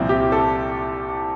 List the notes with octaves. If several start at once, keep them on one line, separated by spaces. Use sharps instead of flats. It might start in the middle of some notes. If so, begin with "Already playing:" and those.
Already playing: C2 A#2 F3 C4 E4
G4
A4